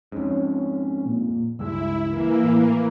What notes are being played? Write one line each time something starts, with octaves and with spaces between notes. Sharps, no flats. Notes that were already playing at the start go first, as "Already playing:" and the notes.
F2 G#2 C#4
A#2
C#2 G2 G#3 E4 E6
E3 A#3
A2